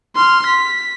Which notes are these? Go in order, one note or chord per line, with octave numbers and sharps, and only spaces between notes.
C6 F6
B6